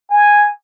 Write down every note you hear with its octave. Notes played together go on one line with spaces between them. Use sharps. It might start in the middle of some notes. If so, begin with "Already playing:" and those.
G#5